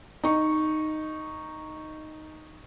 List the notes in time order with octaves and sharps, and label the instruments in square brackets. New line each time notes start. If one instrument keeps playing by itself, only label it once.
[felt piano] D#4 C#6